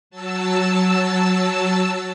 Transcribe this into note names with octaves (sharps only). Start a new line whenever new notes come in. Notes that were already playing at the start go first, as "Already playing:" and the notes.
F#3 A5 E6